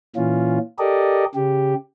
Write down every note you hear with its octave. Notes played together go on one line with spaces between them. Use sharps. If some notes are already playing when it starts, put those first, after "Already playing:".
A#2 E3 C#4 F4
G4 A4 A#4 D5 D#5
C#3 G4